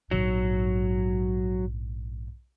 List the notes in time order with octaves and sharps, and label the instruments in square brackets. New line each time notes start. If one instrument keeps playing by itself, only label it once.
[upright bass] A#1 G#2 [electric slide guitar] F#3